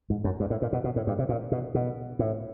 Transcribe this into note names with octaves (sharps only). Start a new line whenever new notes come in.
G#2
F#2
G2
A2
A#2
B2
B2
A2
G2
C3
A#2
B2
B2
A2